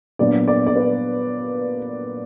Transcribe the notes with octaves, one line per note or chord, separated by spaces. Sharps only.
A#2 F#3 B3 D4 D5
D5
D5
B4